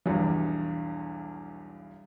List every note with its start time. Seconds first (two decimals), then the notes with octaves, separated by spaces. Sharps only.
0.06 B1 E2 G2 E3